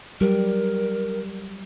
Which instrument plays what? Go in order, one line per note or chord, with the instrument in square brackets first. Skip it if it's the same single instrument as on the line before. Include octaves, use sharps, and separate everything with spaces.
[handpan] F#3 G3 G4 [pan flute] A#4